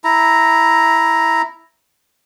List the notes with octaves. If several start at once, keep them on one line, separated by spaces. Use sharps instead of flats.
E4 A#5